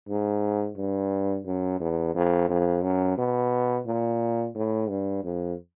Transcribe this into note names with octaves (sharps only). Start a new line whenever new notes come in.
G#2
G2
F#2
E2
F2
F2
F#2
B2
A#2
A2
G2
F2